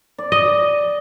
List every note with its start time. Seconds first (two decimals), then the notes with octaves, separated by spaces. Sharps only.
0.18 D5
0.32 D#5